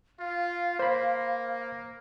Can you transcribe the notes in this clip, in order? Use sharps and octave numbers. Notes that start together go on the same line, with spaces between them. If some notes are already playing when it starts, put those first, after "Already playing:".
F4 F5
A#3 C5 B5